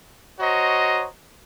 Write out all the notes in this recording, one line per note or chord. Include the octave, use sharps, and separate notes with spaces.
F#4 C5 C#5 D#5 A#5